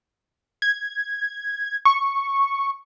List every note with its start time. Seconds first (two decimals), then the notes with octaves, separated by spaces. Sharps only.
0.62 G#6
1.85 C#6